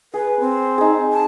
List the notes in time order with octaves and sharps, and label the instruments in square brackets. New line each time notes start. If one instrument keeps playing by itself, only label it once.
[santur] G#4 [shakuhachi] B4
[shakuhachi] C4
[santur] D#4 G#4
[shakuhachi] A5